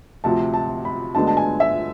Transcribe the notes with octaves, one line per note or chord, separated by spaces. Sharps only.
D2 C3 F3 A5
A5
B5
D2 D3 G#3 B3 D4 A5
A5
G#5
E5